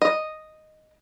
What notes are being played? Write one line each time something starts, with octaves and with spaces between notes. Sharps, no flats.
D#5